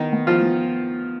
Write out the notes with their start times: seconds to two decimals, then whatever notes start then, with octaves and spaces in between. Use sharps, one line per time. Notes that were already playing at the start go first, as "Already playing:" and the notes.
Already playing: D#3 B3 D#4
0.13 B3
0.27 F3 F4
0.41 B3